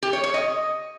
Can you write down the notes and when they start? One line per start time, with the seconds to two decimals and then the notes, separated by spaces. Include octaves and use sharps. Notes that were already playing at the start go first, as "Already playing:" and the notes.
0.03 G4
0.13 C#5
0.24 C#5
0.34 D#5